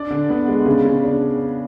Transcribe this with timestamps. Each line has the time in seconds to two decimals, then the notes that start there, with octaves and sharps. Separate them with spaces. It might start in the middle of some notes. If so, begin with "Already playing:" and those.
Already playing: D4 D5
0.10 D3
0.29 B3
0.48 G#3
0.66 C#3
0.85 C#3
1.04 D4